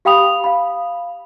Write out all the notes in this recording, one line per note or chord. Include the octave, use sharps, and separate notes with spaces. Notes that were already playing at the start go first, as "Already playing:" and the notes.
G4 F5 G5 B5 D#6 F7
F5 B5